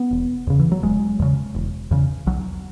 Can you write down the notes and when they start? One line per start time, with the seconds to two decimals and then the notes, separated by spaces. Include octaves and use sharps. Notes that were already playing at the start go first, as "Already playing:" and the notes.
Already playing: B3
0.11 E1
0.47 E2 C#3
0.59 E3
0.72 F#3
0.83 E1 G#3
1.19 E2 C#3
1.55 E1
1.91 E2 C#3
2.26 B1 F#3